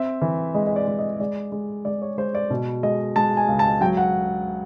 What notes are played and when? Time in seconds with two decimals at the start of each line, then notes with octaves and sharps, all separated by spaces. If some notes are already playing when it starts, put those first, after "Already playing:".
Already playing: C4 E5
0.22 E3
0.55 G#3 D#5
0.67 D#5
0.76 D5
0.87 G#3
0.99 D#5
1.20 G#3 D5
1.52 G#3
1.85 G#3 D5
2.02 C#5
2.17 G#3 C5
2.35 D5
2.50 B2
2.83 G#3 D#5
3.16 G#3 A5
3.37 G#5
3.48 C#2
3.59 A5
3.81 F#3 G5
3.97 F#5